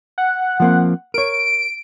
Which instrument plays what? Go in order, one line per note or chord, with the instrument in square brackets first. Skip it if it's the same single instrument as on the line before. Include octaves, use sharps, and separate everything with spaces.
[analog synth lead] F#5
[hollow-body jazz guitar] F3 A#3 C4
[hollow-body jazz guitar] A#4 C#5 [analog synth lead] D7